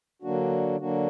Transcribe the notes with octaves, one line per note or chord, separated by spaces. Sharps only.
D3 F#3 A#3 D4 F#4
D3 F#3 A#3 D4 F#4